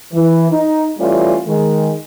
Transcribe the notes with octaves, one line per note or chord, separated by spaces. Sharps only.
E3
D#4
E3 G3 A3 C#4 F4
D#3 G#3